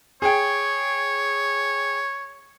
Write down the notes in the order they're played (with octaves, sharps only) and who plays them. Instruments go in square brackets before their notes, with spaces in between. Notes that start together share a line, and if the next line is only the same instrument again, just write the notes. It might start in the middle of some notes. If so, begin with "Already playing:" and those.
[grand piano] G#4 G5 [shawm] C#5